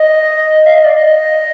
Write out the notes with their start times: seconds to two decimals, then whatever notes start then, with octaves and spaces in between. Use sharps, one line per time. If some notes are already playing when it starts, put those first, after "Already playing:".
Already playing: D#5
0.66 F5
0.75 D#5
0.85 D5
0.94 D#5